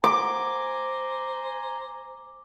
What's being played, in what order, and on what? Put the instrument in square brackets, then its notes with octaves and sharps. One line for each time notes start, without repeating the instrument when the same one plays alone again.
[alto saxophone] C5 [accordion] G#5 A#5 [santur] D6